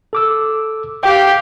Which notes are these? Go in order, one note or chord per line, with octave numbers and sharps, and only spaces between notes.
A4 D6 E6
G4 F5 G5